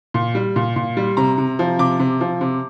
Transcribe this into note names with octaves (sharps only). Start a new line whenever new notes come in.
A#2
G3
A#2
A#2
G3
C3 A#5
C3
F3
C3 D6
C3
F3
C3